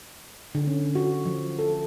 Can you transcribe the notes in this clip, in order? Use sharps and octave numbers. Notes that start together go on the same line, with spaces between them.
D3
C#4
F#4
F3
A4